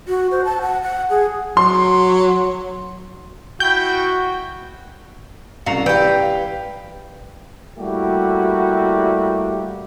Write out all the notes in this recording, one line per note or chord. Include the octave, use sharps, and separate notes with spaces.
F#4
C5
A5
F#5
F#5
G#4
F#3 C6
E4 F#4 G5 G6
C2 C#3 F#4 F5 A#5 C7 F7
E3 G4 B4 D5 G5
F5
G3 A3 A#3 E4 F#4 G4